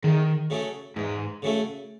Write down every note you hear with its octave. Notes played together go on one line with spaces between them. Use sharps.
E2 D#3
C#3 F#3 A3 C#4
E2 G#2
C#3 F#3 A3 C#4